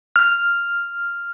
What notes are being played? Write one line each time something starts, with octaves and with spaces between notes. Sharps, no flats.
F6